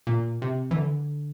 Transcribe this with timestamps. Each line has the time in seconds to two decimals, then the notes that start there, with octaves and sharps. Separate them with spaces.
0.07 A#2
0.42 C3
0.71 E3
0.76 D3